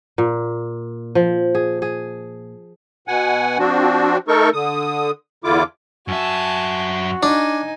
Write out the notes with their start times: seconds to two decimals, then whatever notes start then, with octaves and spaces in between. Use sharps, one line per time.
0.18 A#2
1.15 F3
1.55 G#4
1.82 G#4
3.08 B2 F#5 G#5
3.59 F3 C4 D4 F#4
4.28 A3 D#4 A4 A#4 C#6
4.53 D3 D#6
5.44 E2 D3 E4 F4 D6
6.08 F#2 F#4 E5 G#5 A5
7.23 D4 D#4 G#5